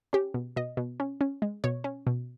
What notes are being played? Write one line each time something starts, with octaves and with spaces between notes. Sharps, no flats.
C#4 G4
B2
B2 D#5
B2
C#4
C#4
G#3
B2 C#5
C#4
B2